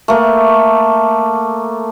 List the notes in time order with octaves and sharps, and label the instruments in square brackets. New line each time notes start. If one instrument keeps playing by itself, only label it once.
[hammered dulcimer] A3 A#3 E5